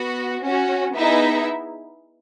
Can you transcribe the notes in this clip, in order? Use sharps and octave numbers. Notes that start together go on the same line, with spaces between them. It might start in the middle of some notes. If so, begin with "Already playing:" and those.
Already playing: B3 F#4
C#4 F#4
B3 D#4 E4 G#4 E5